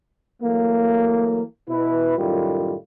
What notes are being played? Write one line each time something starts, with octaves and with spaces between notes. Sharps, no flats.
E3 F#3 A3 A#3
B2 E4 B4
F#2 A2 D#3 G3 A3 F4